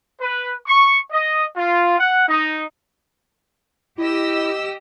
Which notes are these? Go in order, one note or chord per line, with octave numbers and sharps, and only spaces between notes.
B4
C#6
D#5
F4
F#5
D#4
E4 G4 D#5 E6